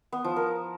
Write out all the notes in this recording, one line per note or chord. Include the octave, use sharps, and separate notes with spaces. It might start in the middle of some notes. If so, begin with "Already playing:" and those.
B3
F3
A#4